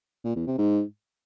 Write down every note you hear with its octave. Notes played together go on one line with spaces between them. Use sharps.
A#2
E2
C3
G#2